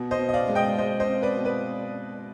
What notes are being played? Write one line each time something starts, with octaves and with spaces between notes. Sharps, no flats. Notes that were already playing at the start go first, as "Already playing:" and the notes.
Already playing: B2
C5 D#5
B2
D#5
D5 F5
G#3
D#5 G5
G#3 C5 D#5
C5 D#5
C4
B4 D5
B2
B4 D5